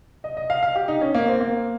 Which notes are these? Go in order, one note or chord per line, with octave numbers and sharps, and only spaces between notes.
D#5
D#5
F5
F5
G4
D#4
C#4
A#3
C4
A#3